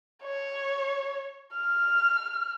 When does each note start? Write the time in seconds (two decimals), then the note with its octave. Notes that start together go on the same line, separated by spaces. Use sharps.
0.23 C#5
1.54 F6